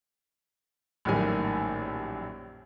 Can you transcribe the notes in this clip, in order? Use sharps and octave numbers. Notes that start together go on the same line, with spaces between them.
A#1 F#2 A2 D#3 G3 G#5